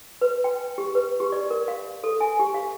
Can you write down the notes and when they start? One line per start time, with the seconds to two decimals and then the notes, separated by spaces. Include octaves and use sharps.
0.21 B4
0.44 G5
0.78 G4
0.95 B4
1.20 G4
1.32 D5
1.50 A#4
1.68 F5
2.04 A4
2.21 G#5
2.39 G4
2.54 F5